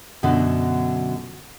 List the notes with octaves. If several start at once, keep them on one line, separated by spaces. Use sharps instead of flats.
F#2 B2 D3 F#3